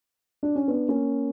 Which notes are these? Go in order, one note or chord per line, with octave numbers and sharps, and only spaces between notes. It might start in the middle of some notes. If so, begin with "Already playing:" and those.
D4
C#4
B3 D4
A#3 C#4